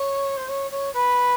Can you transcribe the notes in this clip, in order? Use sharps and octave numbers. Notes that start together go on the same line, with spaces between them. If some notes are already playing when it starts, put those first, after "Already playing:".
Already playing: C#5
C5
C#5
C#5
B4